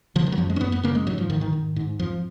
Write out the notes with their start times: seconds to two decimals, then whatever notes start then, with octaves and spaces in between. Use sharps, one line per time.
0.15 C#3 F3
0.27 D#3
0.32 F#3
0.38 F#2 F3
0.50 G#3
0.56 C#4
0.61 F#2 B3
0.72 B3
0.83 C#3 A#3
0.95 G#3
1.07 G#2 F#3
1.18 F3
1.30 G#2 D#3
1.41 D#3
1.53 G#2
1.76 G#2
1.99 F2 F3